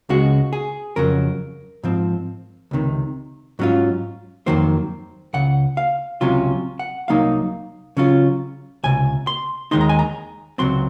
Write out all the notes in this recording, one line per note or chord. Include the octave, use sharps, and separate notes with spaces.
C#2 C#3 G#3 F#4
G#4
F2 C#3 F#3 A#4
G#2 F3 C4
C#2 C3 D#3
G#2 F#3 C#4 F4
F2 D#3 F#3 A#3 C5
C#2 C#3 F#5
F5
C#2 C3 F#3 C#4 F4
F#5
C2 C3 F#3 A#3 D#4 F5
C#3 F#3 C#4 F4
C#2 C3 G#5
C6
D#2 D#3 G#3 D#4 C6
A#5
G#5
A#5
C#2 C3 F#3 C4 C6